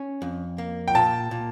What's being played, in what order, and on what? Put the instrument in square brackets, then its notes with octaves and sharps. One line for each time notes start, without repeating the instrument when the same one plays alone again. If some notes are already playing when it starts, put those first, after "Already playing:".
Already playing: [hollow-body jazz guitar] C#4
F2
A#3
[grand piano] G5
[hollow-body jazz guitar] A#2 [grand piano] A5
[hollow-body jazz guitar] A#2